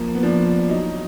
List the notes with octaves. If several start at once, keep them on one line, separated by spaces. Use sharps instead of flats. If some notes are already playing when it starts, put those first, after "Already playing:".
Already playing: F3 A#3
B3
F3 D4
F#3 D#4